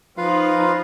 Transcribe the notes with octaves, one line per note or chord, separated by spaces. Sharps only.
F3 D#4 F4 B4 F5